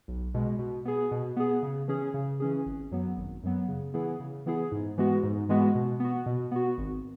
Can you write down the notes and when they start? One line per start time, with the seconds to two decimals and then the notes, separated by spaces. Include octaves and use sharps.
0.08 B1
0.34 B2 G#3
0.59 B2
0.85 B3 G#4
1.11 B2
1.36 B3 G#4
1.63 C#3
1.88 E3 C#4 G#4
2.14 C#3
2.40 E3 C#4 G#4
2.66 G#1
2.91 F#2 F#3 B3
3.17 G#1
3.43 F#2 F#3 B3
3.68 C#3
3.94 E3 B3 E4 G#4
4.20 C#3
4.46 E3 B3 E4 G#4
4.72 G#2
4.98 E3 G#3 B3 F#4
5.23 G#2
5.49 E3 G#3 B3 F#4
5.75 B2
6.00 B3 F#4
6.26 B2
6.51 B3 F#4
6.78 G#1